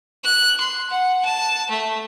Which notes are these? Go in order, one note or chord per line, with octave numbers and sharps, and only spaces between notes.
F#6
C6
F#5
A5
A3